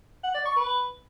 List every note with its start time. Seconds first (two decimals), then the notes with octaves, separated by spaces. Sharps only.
0.23 F#5
0.34 D5
0.45 C#6
0.56 B4